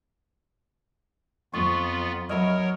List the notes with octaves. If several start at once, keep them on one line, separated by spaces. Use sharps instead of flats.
F2 B3 F4 C#6
F#3 A#4 C#5 D#5 E5 B5